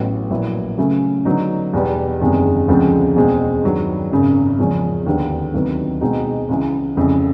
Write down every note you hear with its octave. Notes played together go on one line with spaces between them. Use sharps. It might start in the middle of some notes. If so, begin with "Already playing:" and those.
Already playing: A1 A2 F#3 B3
A#1 A#2 F#3 B3 E4
C#3 F#3 A3 C#4
D3 F#3 B3 D#4
E2 B2 G3 B3
F#1 E2 C3 D#3 G#3
D2 C#3 F3 G#3 C4
E2 B2 G#3 C4
G2 D#3 F#3 B3
G#1 F#2 C#3
E2 C#3 F3 G#3 C#4
D#2 D3 G3 B3 D4
D2 C3 D#3 F#3 B3
B2 G#3 C4 D#4 F#4
C#2 C#3 E3
F1 F2 C#3 E3